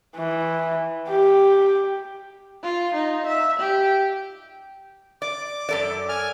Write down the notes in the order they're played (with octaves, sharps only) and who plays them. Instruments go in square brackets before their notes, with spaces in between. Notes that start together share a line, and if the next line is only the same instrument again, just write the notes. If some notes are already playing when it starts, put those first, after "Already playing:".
[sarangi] E3
G4
F4
D#4
E5
G4
[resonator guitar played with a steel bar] D5 [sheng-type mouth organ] D6
[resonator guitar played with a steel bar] F#2 A4 D5
[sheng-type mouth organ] G#5 F6